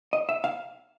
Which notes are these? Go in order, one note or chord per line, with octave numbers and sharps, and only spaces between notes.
D#5
E5
F5